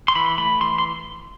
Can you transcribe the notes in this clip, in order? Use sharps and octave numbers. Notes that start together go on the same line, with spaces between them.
C6
E3 B5
A3 B5
E3 C6
C6